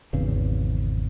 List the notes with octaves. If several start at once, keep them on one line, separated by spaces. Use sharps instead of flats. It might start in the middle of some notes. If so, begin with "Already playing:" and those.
G#1 E2 C#3